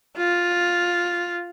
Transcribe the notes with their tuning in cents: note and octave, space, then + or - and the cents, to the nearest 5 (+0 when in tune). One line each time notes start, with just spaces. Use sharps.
F4 +5